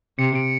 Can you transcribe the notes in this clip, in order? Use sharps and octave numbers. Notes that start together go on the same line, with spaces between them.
C3 C#7
D7